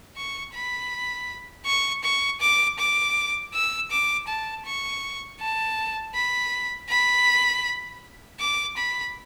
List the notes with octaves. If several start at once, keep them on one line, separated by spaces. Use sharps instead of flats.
C#6
B5
C#6
C#6
D6
D6
E6
D6
A5
C#6
A5
B5
B5
D6
B5